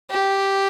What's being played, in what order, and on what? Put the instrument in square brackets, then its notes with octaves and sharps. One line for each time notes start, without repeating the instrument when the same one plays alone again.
[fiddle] G4